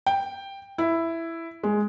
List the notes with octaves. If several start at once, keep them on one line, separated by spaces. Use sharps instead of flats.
G5
E4
G#3